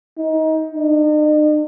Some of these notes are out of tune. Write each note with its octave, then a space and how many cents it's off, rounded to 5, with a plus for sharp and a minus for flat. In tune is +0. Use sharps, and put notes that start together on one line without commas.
D#4 +25
D#4 -45